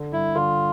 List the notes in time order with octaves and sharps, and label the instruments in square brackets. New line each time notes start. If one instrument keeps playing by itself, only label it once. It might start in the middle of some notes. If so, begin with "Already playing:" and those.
Already playing: [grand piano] D3
[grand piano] G2 [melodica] E4
[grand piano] D3 [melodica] F4